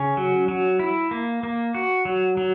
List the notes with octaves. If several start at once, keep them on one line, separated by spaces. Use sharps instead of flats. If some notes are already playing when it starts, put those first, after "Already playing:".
Already playing: C#3 C#4
F#3
F#3
E4
A#3
A#3
F#4
F#3
F#3